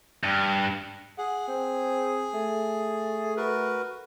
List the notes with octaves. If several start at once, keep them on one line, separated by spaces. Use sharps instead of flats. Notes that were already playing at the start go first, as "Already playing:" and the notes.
G2
G#4 F#5
C4
A3
F#4 A#4 B4